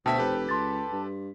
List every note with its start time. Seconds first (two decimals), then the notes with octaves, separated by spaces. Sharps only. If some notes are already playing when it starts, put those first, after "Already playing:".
0.06 D2 B2 C5 E5 G5 A5 B6
0.18 F1 G4 A4 B4
0.49 C#2 A5 C6 A6
0.93 G2